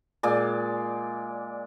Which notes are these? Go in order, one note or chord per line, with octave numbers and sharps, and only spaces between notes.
A#2 G#3 D5